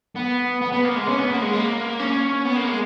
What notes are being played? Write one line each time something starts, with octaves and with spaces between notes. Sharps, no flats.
B3
B3
B3
A#3
G#3
C#4
B3
A#3
G#3
A#3
C#4
B3
A#3
G#3